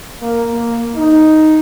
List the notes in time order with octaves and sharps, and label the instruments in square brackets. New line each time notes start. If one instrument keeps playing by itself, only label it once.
[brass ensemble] A#3
A#3
D#4